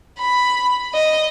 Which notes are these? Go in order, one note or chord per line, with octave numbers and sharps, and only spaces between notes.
B5
D#5